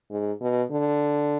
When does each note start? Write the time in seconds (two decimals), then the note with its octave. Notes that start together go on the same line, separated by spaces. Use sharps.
0.11 G#2
0.41 B2
0.71 D3